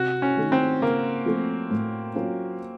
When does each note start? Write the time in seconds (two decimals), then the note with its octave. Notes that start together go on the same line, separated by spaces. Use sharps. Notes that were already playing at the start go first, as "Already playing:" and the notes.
Already playing: C3 F#4
0.22 C#4
0.37 D#3 A3 D#4
0.52 C4
0.81 C#3 A#3
1.26 F3 A3 C4
1.71 A2
2.15 F#3 A#3 C#4 F4